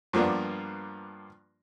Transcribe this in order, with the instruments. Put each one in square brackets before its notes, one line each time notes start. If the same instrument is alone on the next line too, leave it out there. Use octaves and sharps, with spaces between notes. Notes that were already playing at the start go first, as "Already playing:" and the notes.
[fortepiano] G2 F3 A#3 B3 D4